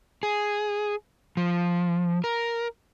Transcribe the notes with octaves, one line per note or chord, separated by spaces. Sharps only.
G#4
F3
A#4